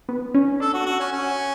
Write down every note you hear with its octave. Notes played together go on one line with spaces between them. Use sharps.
B3
C#4
D4 A4
F#4
F#4
C#4
C#4